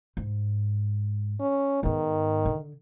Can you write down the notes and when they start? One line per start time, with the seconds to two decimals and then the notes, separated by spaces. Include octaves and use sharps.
0.17 G#2
1.40 C#4
1.83 G#2 D#3 B3
2.45 D3